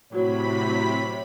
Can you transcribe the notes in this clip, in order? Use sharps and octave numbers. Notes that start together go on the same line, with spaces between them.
A2 C3 F#3 C#5 B5 B6